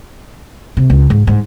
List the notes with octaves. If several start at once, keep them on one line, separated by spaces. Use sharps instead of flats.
C3
C#2
G#2
G#2